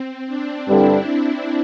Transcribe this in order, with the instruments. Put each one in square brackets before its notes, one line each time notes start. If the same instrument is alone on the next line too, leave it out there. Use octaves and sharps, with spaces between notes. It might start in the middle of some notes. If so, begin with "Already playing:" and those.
Already playing: [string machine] C4
D4
[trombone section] G2 D3 G3 [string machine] E4